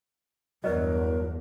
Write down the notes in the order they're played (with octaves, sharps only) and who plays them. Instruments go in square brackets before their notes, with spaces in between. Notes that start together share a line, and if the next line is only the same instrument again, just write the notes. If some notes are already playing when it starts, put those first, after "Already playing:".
[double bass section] E2 G2 [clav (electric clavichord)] F#3 [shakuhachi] A#4 [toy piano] B4 D5 D#5